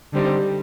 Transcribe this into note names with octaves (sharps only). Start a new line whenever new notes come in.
D3 G3 C4 D#4